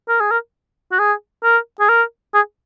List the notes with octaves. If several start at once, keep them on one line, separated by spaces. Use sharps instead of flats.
A#4
G#4
A#4
F#4
G#4
A#4
G#4
A#4
G#4